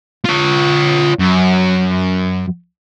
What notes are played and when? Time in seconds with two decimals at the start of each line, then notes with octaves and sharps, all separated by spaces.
0.25 F4 C#5
1.19 F#2